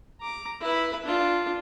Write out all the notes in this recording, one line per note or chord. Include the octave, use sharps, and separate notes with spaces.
A#5 D6
E4 B4
D4 F4